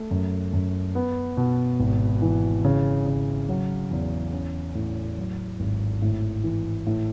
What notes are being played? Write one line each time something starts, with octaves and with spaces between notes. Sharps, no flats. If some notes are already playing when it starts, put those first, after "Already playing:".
Already playing: A3
F#2
F#2
B3
B2
G#1
E3
C#3
C#3
F#3
E2
C#4
A2
F#3
G#1
A2
E3
A2